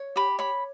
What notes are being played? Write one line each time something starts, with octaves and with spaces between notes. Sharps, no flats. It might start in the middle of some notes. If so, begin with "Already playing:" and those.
Already playing: C#5
G4 B5
C#5 B5